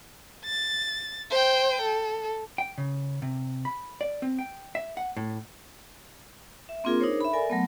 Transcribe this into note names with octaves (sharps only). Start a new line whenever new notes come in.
A6
C5 G5
A4
G5
C#3
C3
B5
D5
C4
G5
E5
F#5
A2
E5
A#3 C4 D4 F4 G#4 A#4
D4 D#4 G#4 A#4 C5 C#5
E5 B5
A4 A#4 D5 E5 G#5
F#3 A3 B3